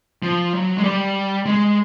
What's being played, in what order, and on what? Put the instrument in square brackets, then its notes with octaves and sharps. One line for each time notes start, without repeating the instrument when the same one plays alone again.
[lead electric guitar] F3
F#3
G#3
G3
G#3